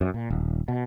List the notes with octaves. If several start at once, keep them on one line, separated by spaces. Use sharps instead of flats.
F#2
A#2
D#1
B2